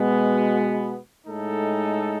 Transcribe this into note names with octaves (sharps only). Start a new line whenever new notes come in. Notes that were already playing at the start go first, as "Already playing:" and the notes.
Already playing: B2 G#3 B3 F#4
A2 G#3 D#4 A4